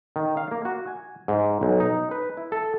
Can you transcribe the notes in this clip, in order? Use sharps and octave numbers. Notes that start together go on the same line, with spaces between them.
D#3
F5
A#3
F#4
G#5
G#2
B1
D#4
B4
E4
A4